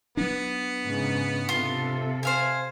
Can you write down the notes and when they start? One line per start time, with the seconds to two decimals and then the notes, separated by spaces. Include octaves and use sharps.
0.17 F#3 B3 D4
0.83 G#2 C#3
1.49 C3 F4 A4
2.23 C5 F5 G#5